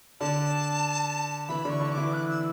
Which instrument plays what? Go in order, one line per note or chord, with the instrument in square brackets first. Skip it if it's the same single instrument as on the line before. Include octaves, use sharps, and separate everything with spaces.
[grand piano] D3 D4 [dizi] A5
[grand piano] E3 E4 [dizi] B5
[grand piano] D3 D4
[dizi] C#6
[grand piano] D3 D4
[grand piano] E3 E4 [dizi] D6
[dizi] F#6
E6